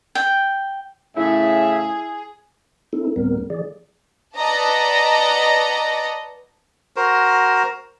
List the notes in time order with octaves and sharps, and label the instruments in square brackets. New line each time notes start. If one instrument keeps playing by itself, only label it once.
[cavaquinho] G5
[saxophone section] A2 C#3 [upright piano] E4 [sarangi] G#4 [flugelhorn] E5
[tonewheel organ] C4 D#4 E4 A4
D2 A2 G3 B3 C4 A#4
E3 G#4 D5
[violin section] B4 D5 D#5 F#5 A5 A#5
[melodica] F#4 A#4 C5